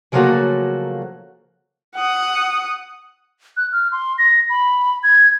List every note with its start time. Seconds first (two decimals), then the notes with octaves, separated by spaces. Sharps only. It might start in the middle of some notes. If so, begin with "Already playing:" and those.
0.12 C#3 F3 F#3 A3 A#3 F#4
1.95 F#5 D#6
3.57 F#6
3.72 F6
3.92 C6
4.18 A#6
4.49 B5
5.03 G#6